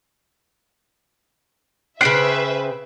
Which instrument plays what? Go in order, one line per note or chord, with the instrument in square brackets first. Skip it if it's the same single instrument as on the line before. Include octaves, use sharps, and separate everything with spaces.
[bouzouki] C#3 C5 G5 [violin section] B4 E5 [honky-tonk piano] F#6 C7 D7